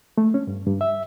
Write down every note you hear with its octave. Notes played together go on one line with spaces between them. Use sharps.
A3
C#4
G2
G2
E5